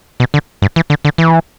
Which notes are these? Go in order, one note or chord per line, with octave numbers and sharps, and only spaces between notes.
B2
D3
G2
E3
D3
D3
E3